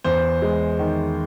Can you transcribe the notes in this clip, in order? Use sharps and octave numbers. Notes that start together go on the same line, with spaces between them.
E2 C5
G#3
D#3